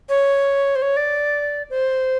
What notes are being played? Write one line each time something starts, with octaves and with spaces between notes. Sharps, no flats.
C#5
C5
C#5
D5
C5